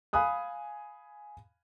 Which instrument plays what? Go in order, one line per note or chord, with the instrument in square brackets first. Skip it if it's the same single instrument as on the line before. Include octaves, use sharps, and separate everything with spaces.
[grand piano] F5 G#5 B5 D#6 F#6